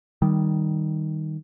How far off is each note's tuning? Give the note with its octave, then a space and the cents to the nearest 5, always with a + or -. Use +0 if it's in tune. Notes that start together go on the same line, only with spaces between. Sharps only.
D#3 +0 G3 +0